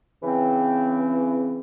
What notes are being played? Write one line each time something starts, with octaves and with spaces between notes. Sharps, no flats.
C#3 E3 C4